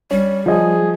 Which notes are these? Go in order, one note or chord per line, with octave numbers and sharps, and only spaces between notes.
G3 C#4
F3 G#4 D#5